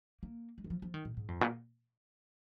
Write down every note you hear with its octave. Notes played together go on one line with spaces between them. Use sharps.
A#3
G#3
D#3
F3
F3
D#3
A#2
G#2
F2
A#2